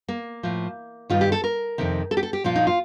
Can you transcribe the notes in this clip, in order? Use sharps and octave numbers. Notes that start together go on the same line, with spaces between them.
A#3
A2 F3
G2 D#3 F4
G4
A4
A#4
F2 C3 D#3
A4
G4
A4
G4
A#2 F3 F4
D#4
F4